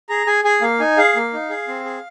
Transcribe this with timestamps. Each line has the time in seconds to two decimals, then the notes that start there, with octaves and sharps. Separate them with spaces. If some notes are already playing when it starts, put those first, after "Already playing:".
0.09 G#4 A#5
0.27 G#4 G#5
0.44 G#4 G#5
0.62 A#3 F5
0.80 D#4 G#5
0.98 G#4 F5
1.16 A#3
1.33 D#4
1.50 G#4
1.68 C4
1.85 G#4